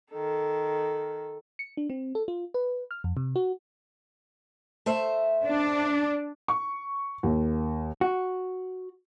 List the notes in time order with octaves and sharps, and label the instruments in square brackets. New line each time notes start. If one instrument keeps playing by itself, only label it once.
[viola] D#3 A4
[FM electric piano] C#7
D4
C4
A4
F4
B4
F6
F2
C3
F#4
[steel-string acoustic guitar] A3 C5 E5
[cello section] D4
[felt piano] C#6
D#2
[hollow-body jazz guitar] F#4